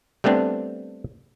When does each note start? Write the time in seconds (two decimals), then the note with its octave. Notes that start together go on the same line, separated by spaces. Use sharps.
0.24 G3 A3 B3 C4 D4